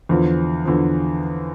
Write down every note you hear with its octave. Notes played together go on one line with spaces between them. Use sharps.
E2 D3 F3
E2 D3 F3